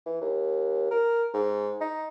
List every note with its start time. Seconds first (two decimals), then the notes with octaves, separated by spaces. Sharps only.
0.06 E3
0.21 D#2
0.91 A#4
1.34 G#2
1.81 D#4